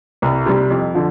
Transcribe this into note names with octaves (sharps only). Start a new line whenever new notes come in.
C2
C3 G3
F2
D3 F3